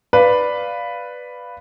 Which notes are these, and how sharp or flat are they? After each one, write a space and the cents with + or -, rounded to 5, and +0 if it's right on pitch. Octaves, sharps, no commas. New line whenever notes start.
B4 +0 D5 +0 F5 +0